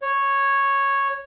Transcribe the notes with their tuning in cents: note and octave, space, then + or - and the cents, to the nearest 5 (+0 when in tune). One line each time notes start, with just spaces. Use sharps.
C#5 -5